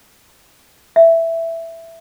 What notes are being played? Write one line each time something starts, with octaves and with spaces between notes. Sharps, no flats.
E5